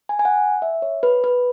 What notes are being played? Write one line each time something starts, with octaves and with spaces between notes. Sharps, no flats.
G#5
G#5
F#5
E5
C#5
B4
B4